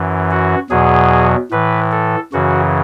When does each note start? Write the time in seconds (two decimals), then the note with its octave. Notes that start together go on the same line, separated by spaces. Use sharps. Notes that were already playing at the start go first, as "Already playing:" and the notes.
Already playing: F#2 E3
0.31 F#4
0.70 E2 B2 F#3 G#4
1.51 A2 E3 B4
1.92 A4
2.33 F#2 C#3 E3 F#4